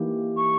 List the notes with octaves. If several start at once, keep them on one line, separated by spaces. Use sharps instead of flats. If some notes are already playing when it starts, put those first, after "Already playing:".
Already playing: E3 A#3 D#4 G4
C#6